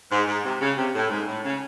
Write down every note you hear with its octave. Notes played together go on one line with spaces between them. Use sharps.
G#2
G#2
C3
C#3
C3
A2
G#2
A2
C#3